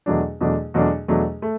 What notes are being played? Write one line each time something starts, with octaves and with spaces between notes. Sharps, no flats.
E2 B2 F#3 A3 D4
E2 B2 F#3 A3 D4
E2 B2 F#3 A3 D4
E2 B2 F#3 A3 D4
A3